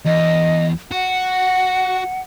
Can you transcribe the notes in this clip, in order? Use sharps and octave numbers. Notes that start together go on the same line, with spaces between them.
E2 D#5
F#4 F#5